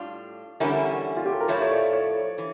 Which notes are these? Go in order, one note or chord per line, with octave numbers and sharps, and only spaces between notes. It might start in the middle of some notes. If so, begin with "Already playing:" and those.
Already playing: A2 G3 D4 F4
E2 D3 G3 C#4 E4 A#4
F4
G4
A4
A#4
A2 F3 A3 E4 C#5
C#5
D5
C#5
E3